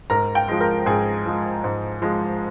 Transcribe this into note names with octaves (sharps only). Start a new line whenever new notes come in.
G#2 A#4 A#5
G5
F3 G#3
A#4 A#5
G#2 G#4 G#5
F3 G#3
G#2
F3 G#3